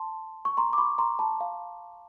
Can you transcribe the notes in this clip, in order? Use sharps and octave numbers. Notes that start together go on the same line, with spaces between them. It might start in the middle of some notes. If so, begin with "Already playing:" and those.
Already playing: A5 C6
C#6
A#5 C6
D6
B5 C#6
A#5 C6
A5 B5
F5